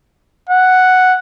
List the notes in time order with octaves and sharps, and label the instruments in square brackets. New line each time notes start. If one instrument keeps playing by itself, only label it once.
[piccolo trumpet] F#5